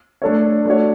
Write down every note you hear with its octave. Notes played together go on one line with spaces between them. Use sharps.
A3 D4 A4 C#5
A3 D4 F#4 C#5